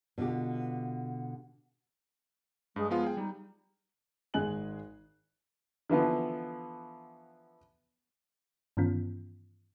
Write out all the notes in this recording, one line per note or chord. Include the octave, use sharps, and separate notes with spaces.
B2 D3 F4 G4
G2 G#3
F3 G#3 B3 F4
G#4 G5
G3 D#4
G#1 G#3 G#4 G#5 F#6 F#7
D3 E3 F3 B3
G2 D#3 E3 B3 C#4 F4